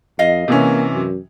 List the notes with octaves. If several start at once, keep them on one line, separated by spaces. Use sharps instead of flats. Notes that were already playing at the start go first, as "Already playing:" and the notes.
F2 D#5 F5
C3 E3 A#3 C#4
F#2